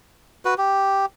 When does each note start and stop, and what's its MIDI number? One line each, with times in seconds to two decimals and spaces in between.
0.45 0.54 66
0.45 0.54 71
0.58 1.06 67